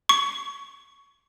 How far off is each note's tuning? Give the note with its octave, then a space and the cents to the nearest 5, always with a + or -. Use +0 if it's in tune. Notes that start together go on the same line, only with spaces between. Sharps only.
C#6 +15